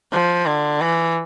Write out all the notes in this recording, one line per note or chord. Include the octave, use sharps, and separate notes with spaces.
F3
D3
E3